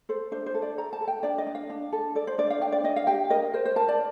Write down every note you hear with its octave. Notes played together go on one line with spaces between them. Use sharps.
A4 C5
D4 C5
C5
A4
D5
A4 A#5
A5
A4
G5
D4 D5
D#5
D4
F5
D4
A4
A4 D5
C5
D4 D5
F5
D4 G5
D5
D4 D#5
F5
G4 G5
A#4 D#5
A#4 C5
C5
A#4 A5
D5